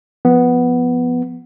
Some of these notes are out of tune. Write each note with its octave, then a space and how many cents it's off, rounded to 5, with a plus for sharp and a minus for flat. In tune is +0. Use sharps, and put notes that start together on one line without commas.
F3 +0 B3 +0